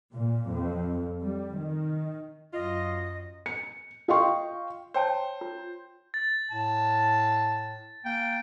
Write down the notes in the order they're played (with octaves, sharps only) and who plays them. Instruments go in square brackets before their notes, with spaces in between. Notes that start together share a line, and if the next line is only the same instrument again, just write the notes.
[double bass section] A#2
F2
G3
D#3
[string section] F#2 [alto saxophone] F4 [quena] D#5
[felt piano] C#7
F4 D#5 F5 G5 C6 C#6
[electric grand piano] C5 [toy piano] C#5 G5 A5
[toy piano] F4
[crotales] A6
[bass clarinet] A2 [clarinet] A5
[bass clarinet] A#3 [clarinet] G5